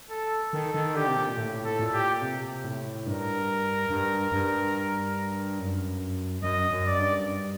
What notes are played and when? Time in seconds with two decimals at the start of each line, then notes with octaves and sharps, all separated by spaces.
0.10 A4
0.53 D#3 A4
0.74 D#3
0.95 D3 G4
1.07 C3
1.16 A#2
1.37 A2
1.65 A4
1.79 A#2
1.93 G4
2.21 C3
2.64 A2
3.06 G2 A#4
3.90 G2
4.32 G2
5.59 F#2
6.42 F#2 D#5
6.71 F#2
6.85 D5
6.99 G2